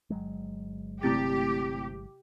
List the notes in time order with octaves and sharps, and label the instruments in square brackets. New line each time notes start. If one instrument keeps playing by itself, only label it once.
[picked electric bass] G1 F#3 G#3
[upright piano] C3 [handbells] A3 E4 A6 [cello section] G4